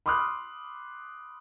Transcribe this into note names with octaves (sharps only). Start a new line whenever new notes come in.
B5 C6 D6 D#6 F6 F#6